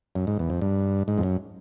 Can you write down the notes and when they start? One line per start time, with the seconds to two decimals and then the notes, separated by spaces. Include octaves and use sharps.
0.15 F#2
0.27 G#2
0.39 E2
0.50 F2
0.62 G2
1.08 G#2
1.18 F2
1.23 F#2